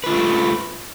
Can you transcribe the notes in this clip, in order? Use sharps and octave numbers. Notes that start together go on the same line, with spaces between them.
A3 F4 B4